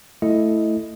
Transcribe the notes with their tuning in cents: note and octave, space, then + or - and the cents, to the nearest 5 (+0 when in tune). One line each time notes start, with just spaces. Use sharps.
A3 +0 E4 +0 D#5 +0